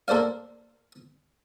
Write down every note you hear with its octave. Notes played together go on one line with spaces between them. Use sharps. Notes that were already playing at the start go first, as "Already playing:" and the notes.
A#3 A4 C5 D5 F5